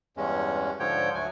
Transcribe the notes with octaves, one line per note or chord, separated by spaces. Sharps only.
E2 G2 G#3 C#4
G#2 D3 F3 C#5 G5
D2 F#3 G#5